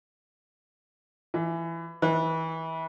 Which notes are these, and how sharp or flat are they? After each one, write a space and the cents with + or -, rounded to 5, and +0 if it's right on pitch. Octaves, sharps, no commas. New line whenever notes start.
E3 +15
E3 -30